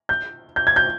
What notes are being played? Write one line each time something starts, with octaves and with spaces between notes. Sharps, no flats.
G6
G6
G#6
G6